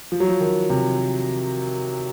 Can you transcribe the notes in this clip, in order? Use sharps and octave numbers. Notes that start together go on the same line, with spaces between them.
F3
F#3
F3
D#3
C3